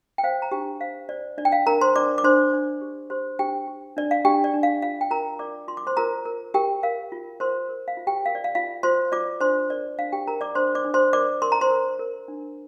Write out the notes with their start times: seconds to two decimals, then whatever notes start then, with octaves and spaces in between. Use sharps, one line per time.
0.18 G5
0.24 C5 F5
0.42 A#5
0.52 D4 G4 G5
0.80 C5 F5
1.09 C5 D5
1.38 D4 D5
1.45 G5
1.52 F5
1.66 D4 A#4 A#5
1.81 C5 C6
1.96 D4 D5 D6
2.18 D6
2.24 D4 C5 C6
2.53 D4
2.81 G4
3.10 G4 C5 C6
3.39 D4 G4 G5
3.67 G4
3.97 D4 D5
4.11 F5
4.25 D4 G4 G5
4.44 D5
4.54 D4
4.63 F5
4.82 F4 F5
5.01 G5
5.11 F4 A#4 A#5
5.39 A#4 D5 D6
5.68 F4 C6
5.77 D6
5.87 C5 C6
5.97 F4 A#4 A#5
6.25 A#4
6.54 G4 A#4 G5
6.83 A#4 F5
7.12 F4
7.40 A#4 C5 C6
7.69 A#4
7.88 F5
7.97 F4
8.07 G4 G5
8.26 A#4 F5
8.35 D5
8.44 F5
8.55 F4 F5
8.83 F4 C5 C6
9.12 F4 D5 D6
9.41 D4 C5 C6
9.70 A#4 D5
9.99 D4 F5
10.12 G4 G5
10.27 A#4 A#5
10.41 D5 D6
10.55 D4 C5 C6
10.75 D5 D6
10.85 D4
10.94 C5 C6
11.13 A#4 D5 D6
11.42 A#4 C6
11.52 A#5
11.61 C5 C6
11.70 A#4
11.99 A#4
12.28 D4